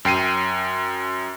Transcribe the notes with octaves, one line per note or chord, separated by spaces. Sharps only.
F#2 G5 C7 D#7